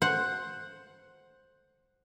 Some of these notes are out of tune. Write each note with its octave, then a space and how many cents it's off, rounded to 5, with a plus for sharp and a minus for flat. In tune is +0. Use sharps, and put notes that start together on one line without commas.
C5 +10 F#5 +0